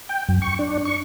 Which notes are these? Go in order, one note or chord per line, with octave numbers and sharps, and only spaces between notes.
G5
F#2
C#6
D4
C#6